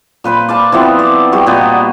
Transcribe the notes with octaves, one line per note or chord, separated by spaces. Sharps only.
A#2 B4 C5 B5
D5 F5 A5
E3 F3 B3 C4
D5
G3 F#4
A#2 B3 C5 D#5